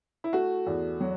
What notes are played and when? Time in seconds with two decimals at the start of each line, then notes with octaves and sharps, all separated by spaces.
0.24 E4
0.33 A3 F#4
0.67 E2
1.01 F#3